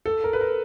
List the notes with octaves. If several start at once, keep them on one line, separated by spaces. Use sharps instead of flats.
A4
A#4
B4
A#4